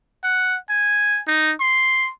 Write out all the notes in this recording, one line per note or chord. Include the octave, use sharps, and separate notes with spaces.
F#5
G#5
D#4
C6